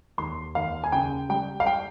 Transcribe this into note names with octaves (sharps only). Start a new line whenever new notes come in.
D#2 C6
D#2 F5
G#5
C#3 G5
G3 G5
F5
G5